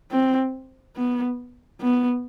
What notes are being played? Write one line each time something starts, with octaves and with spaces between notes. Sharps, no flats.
C4
B3
B3